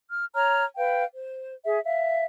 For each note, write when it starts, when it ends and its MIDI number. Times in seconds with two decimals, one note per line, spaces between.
0.10 0.25 89
0.34 0.64 73
0.34 0.64 82
0.34 0.64 89
0.76 1.03 71
0.76 1.03 77
0.76 1.03 79
1.13 1.53 72
1.64 1.79 68
1.64 1.79 76
1.84 2.25 76
1.84 2.25 77